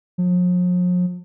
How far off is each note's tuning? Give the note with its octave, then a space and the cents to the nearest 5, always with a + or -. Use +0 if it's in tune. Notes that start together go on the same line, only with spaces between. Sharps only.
F3 +45